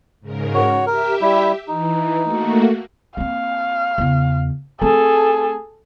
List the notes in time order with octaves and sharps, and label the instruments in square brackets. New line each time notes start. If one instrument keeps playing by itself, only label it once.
[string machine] G#2 C#3 A#4
[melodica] F#4 C#5
[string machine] G4 E5 [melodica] A#4
[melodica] G3 E4
[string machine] E3 [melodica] D#4
[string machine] A3 A#3 F#4
[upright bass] A#3 C4 [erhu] F5
[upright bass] E2 C#3
[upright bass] A3 C4 [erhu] G#4 [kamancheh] A4